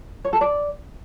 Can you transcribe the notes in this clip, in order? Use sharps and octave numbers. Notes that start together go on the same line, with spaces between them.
C#5
A4
D5